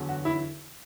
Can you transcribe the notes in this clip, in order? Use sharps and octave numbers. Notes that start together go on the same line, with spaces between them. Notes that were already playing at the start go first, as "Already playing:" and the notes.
Already playing: E2 D3 F#3
F#4
E4